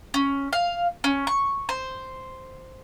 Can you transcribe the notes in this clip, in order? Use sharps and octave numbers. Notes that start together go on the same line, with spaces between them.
C#4
F5
C#4
C#6
C5